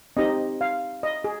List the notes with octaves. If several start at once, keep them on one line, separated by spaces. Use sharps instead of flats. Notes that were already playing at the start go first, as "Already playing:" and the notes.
C4 D#4 G4 D#5
F5
D#5
G#4